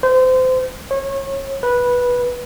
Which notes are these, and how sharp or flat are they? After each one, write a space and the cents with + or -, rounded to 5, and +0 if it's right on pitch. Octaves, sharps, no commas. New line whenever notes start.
C5 -30
C#5 -30
B4 -10